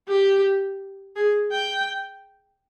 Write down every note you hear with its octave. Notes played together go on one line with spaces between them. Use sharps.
G4
G#4
G5